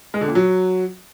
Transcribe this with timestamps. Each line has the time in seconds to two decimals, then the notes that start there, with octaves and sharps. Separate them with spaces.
0.14 G#3
0.21 D3
0.28 A#2
0.35 F#3